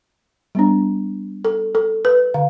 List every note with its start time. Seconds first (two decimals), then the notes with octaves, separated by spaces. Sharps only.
0.55 G3 B3 D4
1.45 A4
1.75 A4
2.05 B4
2.34 D3 F5